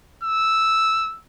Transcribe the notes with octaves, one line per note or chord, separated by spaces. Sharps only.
E6